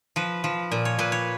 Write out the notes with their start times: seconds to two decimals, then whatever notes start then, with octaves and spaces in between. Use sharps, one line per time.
0.16 F3 B4
0.44 F3
0.72 A#2
0.85 C#5
0.99 A#2 B4
1.12 C#5